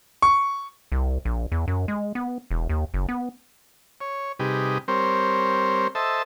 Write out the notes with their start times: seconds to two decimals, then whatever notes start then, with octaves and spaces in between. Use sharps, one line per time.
0.22 C#6
0.92 C2
1.25 A#1
1.52 E2
1.68 F#2
1.88 G#3
2.15 B3
2.51 E1
2.69 D#2
2.94 F#1
3.09 B3
4.01 C#5
4.39 C3 G3 D#4 G4 G#4 B4
4.88 G3 C4 A#4 C5 C#5
5.95 A4 C5 D#5 E5 A5